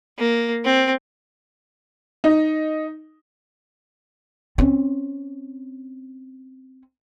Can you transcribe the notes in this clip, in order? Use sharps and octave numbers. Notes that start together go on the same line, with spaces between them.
A#3
C4
D#4
C4 C#4